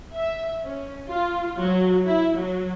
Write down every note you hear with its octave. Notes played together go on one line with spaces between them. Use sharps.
E5
C#4
F4
F#3
E4
F#3